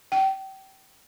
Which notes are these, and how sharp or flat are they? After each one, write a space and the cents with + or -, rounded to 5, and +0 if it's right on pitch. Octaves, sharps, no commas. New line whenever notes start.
G5 -30